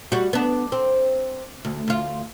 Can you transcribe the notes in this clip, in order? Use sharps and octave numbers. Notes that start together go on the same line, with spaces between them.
G3 F#4
B3 D4
C4
D2
D2 F4